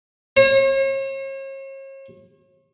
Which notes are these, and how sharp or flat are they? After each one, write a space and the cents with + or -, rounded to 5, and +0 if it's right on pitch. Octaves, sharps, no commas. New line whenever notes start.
C#5 -40